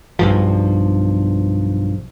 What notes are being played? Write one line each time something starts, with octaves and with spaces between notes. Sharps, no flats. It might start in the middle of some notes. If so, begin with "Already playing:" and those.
B1 G2 F3